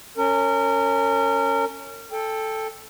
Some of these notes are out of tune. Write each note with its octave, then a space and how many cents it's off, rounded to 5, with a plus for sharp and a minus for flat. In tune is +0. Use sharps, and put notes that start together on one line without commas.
C#4 +0 A#4 -30
A4 +0 G5 +20